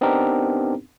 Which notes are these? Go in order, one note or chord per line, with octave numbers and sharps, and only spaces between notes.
B3 C4 D4 D#4 G4 A#4